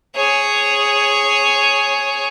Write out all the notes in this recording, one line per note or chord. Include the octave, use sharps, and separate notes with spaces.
G#4 C#5